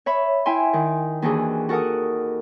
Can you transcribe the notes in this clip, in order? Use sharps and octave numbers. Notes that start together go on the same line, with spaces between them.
C#5 E5 B5
E4 E5 G5 G#5 C6
D#3
D#2 E3 D4 D#4 F#4 G#4
F#4 A4 A#4 F#5 D#6